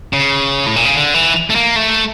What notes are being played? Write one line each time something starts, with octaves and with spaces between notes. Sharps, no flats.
C#3
A2
A#2
C#3
D3
E3
A3
A#3
A3